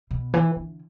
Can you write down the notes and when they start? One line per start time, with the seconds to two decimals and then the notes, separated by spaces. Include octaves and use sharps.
0.11 B2
0.34 E3
0.56 D3